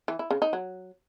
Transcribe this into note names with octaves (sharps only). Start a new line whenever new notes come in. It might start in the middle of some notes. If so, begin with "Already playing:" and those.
E3
E4
C#3
D#4
F#3